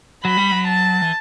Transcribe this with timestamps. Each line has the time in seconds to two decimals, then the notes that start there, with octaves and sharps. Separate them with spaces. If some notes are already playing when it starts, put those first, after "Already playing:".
0.24 F#3 B5
0.37 G3
0.52 F#3
0.68 A5
1.02 E3